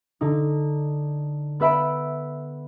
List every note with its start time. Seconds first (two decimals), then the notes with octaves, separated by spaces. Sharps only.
0.21 D3 D#4
1.60 B3 B4 E5 B5 D7